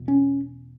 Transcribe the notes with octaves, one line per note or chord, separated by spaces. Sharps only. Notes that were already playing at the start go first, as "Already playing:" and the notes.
Already playing: E1 E2 B2
C#4